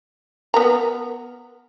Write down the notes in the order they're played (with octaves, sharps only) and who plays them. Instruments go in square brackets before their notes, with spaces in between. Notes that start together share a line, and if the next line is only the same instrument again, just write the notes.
[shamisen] B3 A#4 A#5